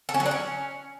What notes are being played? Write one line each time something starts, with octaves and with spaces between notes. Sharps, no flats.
A4
C#4
F#3
D4
C#4